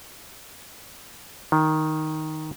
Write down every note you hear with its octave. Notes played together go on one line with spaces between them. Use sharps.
D#3